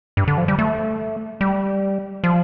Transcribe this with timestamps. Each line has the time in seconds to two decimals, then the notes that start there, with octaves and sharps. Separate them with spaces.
0.17 G2
0.28 D3
0.38 F3
0.48 G3
0.59 A3
1.41 G3
2.24 F3